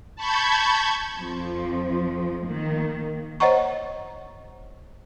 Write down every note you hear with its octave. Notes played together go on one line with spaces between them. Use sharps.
A5 B5 C#6 G6 G#6
F2 F3
D#3 A#3
C5 C#5 D#5 F#5 A#5 C#6